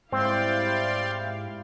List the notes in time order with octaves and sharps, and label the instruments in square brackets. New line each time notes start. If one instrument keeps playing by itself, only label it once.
[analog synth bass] G#2 [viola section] G3 E4 F5 [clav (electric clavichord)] C4 [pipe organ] D5 G5 C6